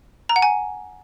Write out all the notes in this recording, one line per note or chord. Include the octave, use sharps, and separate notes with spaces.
A#5
F#5
G#5